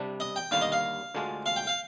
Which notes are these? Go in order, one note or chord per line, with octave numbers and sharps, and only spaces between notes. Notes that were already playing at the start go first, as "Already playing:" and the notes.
Already playing: C3 G3 D4
D#5
G5
D#2 D3 G3 F5
D#5
F5
D2 D3 G#3 D4 F4
F5
G5
F5